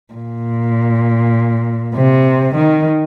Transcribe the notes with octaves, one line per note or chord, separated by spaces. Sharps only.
A#2
C3
D#3